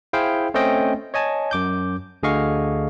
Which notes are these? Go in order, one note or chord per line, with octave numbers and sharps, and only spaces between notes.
E4 G#4 C5 F5 G5
A3 C4 C#4 C5 D#5 G5
C#5 D#5 G#5 A5
F#2 D6 G6
D2 D3 G#4 D#5 F5 C#6